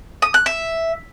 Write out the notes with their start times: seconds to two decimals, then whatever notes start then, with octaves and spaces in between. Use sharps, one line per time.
0.22 D#6
0.34 F#6
0.46 E5